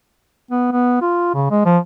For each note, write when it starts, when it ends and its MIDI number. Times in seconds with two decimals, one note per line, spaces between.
0.51 0.72 59
0.72 0.97 59
1.01 1.31 65
1.34 1.51 49
1.51 1.65 56
1.65 1.78 53